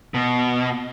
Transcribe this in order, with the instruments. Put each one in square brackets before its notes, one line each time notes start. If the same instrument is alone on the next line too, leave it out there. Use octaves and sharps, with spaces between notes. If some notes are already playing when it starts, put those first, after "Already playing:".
[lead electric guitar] B2